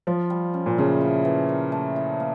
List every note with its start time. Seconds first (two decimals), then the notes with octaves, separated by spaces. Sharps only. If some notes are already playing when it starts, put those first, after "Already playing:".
0.07 F3 F4
0.30 G3
0.54 C#4
0.66 A#2
0.78 C#3 A3
1.01 E4
1.25 E3
1.49 A#4
1.72 A3
1.96 E4
2.20 A#3